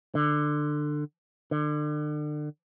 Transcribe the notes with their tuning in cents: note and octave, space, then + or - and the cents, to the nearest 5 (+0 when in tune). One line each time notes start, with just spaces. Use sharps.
D3 +20
D3 +35